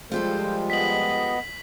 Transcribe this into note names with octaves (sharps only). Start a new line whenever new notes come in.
F3 G3 G#3 F4 G4 A4 C5
B3 D#5 B6 F#7